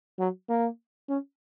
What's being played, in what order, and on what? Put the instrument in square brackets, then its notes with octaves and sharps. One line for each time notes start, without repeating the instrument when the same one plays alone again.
[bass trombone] F#3
A#3
C#4